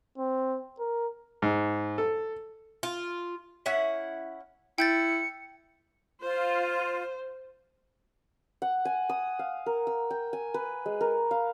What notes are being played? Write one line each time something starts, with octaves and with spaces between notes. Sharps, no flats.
C4
A#4
G#2
A4
F4
C#4 E4 F#5
E4 G5 G6 A6 C#7
F4 C5
F#5
G#5
D#6
F5
A#4
E6
G5
G#5
B4
G#3
A#4
F5